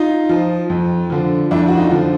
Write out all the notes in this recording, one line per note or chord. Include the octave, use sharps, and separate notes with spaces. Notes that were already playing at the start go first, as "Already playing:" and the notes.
Already playing: D#4 F4
F3
F2
D3 F3
F2 D4 E4
F#4
D#4 F4
D3 F3